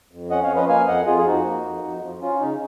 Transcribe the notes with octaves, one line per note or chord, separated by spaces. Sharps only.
F2
C#4 D#5 F#5
C#5 F5
F3
B4 D#5
A#3 F5 G#5
F2 D#5 F#5
F2 F4 G#4
G#4
F3 D#4 F#4
A#3
F2
F2
F3
C#4 F4
C#3 D#4